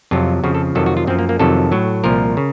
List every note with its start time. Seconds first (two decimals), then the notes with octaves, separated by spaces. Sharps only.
0.11 F2 C3 F#3 F4
0.44 F2 C#3 F3 F#4
0.55 A4
0.75 F2 C3 D#3 F#3 A4
0.86 F#4
0.97 F4
1.07 F#2 F3 C4
1.19 A#3
1.29 A#3
1.39 F2 C3 D#3 F#3 A4
1.72 A2 F#3
2.04 C2 A#2 F3 A#4
2.37 C#3